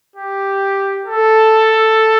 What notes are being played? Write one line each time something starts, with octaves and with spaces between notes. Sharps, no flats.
G4
A4